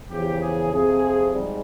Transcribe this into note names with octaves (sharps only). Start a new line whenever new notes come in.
E2 C#3 F3 G4
G#4
F2 C3 F3 G#4
G#2 G3